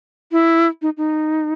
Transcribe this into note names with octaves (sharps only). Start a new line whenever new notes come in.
E4
D#4
D#4